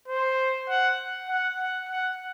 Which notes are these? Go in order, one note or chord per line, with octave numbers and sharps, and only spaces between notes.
C5
F#5
F#5
F#5
F#5